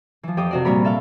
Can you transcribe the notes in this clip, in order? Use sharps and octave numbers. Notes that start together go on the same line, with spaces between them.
E3 F3
F2 G4 G5 D6 D#6
C3 F#4 D5
A#2 G3 C4 A#4 C#5 B5
A4 E5 F5